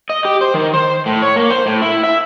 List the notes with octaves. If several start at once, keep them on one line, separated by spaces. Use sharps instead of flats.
D#5
G4
C5
D#3
C5
A2
C#5
A#3
C5
A2
E4
E5